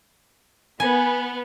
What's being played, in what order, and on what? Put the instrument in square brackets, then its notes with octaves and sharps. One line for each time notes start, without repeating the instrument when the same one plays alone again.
[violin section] B3 [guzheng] G#5